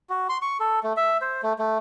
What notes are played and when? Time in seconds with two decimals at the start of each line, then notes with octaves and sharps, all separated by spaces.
0.10 F#4
0.29 C6
0.42 C#6
0.60 A4
0.83 A3
0.97 E5
1.21 C5
1.43 A3
1.59 A3